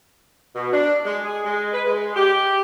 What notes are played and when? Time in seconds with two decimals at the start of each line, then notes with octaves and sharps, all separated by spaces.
0.55 B2
0.72 D4
1.05 G#3
1.24 G#4
1.44 G#3
1.73 B4
1.86 G#3
2.16 G4